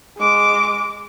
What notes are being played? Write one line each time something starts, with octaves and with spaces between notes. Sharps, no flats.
G#3 D6